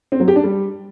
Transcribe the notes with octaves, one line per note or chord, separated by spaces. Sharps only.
C4
F#3
G4
D4
G3